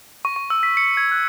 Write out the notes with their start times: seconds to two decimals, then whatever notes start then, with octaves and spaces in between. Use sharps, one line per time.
0.25 C#6
0.36 C#6
0.50 E6
0.63 B6
0.77 C#7
0.97 G#6
1.12 F#6